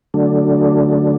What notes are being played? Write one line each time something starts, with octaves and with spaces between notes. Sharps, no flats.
D3 F#3 A3 D4